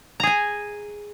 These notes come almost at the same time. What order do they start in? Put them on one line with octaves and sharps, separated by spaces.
A#5 G#4 G#5